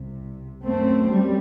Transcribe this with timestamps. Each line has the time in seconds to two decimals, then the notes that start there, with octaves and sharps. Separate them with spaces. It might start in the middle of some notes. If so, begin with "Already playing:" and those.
Already playing: C2 C3
0.65 F#2 A3 C4
1.10 G3